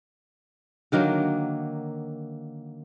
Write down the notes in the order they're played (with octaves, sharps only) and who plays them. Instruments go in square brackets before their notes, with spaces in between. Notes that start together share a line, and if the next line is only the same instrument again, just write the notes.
[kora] D3 D#3 F#3 A#3